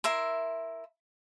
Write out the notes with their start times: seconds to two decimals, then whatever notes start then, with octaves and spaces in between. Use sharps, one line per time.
0.04 E4 A#4 E5 C6